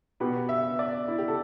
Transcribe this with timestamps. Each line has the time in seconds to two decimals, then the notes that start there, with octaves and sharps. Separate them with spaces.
0.20 B2 B3 G4 B4
0.49 E5
0.79 D5
1.08 E4
1.18 G4
1.28 A4